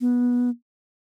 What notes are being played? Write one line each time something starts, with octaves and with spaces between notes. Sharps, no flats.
B3